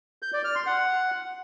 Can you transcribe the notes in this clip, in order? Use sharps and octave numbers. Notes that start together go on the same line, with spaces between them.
G6
D5
F6
C6
F#5